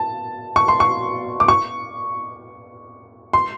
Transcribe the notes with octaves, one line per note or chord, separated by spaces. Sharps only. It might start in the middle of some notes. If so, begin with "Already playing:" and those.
Already playing: A5
C#6
C6
C#6
D6
C#6
C6